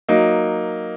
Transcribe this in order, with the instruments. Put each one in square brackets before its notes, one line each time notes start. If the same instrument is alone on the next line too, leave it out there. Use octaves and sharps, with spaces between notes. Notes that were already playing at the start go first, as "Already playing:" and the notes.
[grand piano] F#3 A#3 D#4